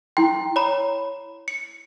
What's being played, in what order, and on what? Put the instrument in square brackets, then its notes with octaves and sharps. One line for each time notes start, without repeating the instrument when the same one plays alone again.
[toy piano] E4 C6 [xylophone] G5
[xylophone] C#5 A#5 B5
C#7